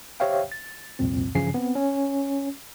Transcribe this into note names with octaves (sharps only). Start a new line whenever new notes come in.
G4 C5 C#5 E5 F5 G5
A6
C2 F2 A#2 C4
G2 C#3 E3 F3 G#5 C7
B3 C4
C#4